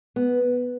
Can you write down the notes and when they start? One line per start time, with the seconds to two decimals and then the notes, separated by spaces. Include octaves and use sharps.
0.16 B3